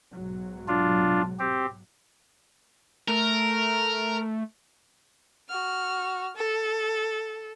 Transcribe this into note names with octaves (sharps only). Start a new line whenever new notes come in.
B1 G#2 F#3
D4 F4
C4 G4
A3 A#4
F#4 F6
A4